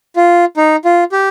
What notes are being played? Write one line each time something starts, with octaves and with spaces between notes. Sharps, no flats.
F4
D#4
F4
G4